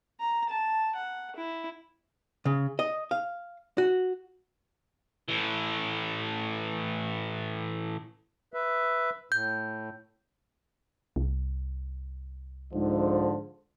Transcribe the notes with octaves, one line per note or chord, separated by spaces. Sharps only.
A#5
A5
F#5
E4
C#3
D#5
F5
F#4
A2 E3
B4 E5
A2 G6
C2
G#2 D3 F3